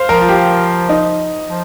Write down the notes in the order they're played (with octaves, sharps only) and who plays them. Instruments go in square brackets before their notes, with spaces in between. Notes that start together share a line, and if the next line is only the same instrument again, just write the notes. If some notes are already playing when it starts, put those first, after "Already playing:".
Already playing: [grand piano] C5 F5
[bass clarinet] F3 [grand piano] A#4
[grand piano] F4
G4
D#4
[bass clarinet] F3